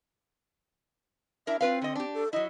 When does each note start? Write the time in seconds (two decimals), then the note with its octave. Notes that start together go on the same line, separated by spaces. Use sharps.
1.47 D4 E4 A#4 E5
1.61 C4 F4 B4 F5
1.82 D3 D#5
1.95 D4 G4
2.14 A4
2.33 F#3 E4 D#5